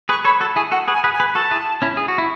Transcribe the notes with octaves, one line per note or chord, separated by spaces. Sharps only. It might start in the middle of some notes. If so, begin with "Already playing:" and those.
G#4 B4 C#6
A4 C#5 B5
F#4 A4 A5
E4 G#4 G#5
F#4 A4 F#5
G#4 B4
G#5
G#4 B4
G#5
G#4 B4
F#4 A4 A5
E4 G#4
C#4 E4
G#4
F#4
E4